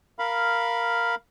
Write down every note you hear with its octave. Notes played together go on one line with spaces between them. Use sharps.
A#4 F5 B5